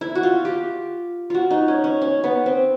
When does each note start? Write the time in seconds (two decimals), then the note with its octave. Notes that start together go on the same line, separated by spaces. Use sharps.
0.01 E4
0.15 F#4
0.23 F4
0.45 G4
1.30 F4 F#4
1.51 D#4
1.68 C#4
1.84 C#4
2.02 C#4
2.24 B3
2.46 C4